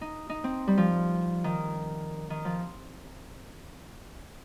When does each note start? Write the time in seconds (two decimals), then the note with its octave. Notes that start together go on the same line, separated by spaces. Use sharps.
0.01 D#4
0.30 D#4
0.44 C4
0.67 G3
0.77 F3
1.44 D#3
2.30 D#3
2.45 F3